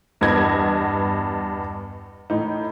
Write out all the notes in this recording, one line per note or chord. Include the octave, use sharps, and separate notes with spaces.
E2 G2 B3 D#5 G#6
A2 D#4